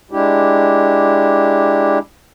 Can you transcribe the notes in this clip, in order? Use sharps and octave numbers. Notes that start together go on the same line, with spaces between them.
G#3 D4 E4 G4